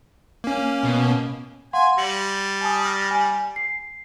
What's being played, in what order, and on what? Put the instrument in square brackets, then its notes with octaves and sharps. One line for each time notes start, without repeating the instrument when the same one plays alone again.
[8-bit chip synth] A#3 C#4
[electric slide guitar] B2
[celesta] F5 F#5 C6 [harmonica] G#5
[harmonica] G3 [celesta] A#6 C#7 F#7
[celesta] G#5 A5 D#6
F6 A6 A#6
G#5
C7